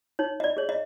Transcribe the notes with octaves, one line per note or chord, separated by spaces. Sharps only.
D#4 C#5
D#5
D5
G#4 C#5
D#5